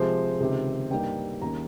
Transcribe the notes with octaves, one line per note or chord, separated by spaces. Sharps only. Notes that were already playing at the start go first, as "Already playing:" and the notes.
Already playing: C3 F3 G#3 C5
C#2 C3 D#3
G2 G3 A#3 D#4 G5
D#2 D#3 A#3 C#4 A#5